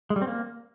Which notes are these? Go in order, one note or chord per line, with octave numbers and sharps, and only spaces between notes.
G#3
G3
C4
A#3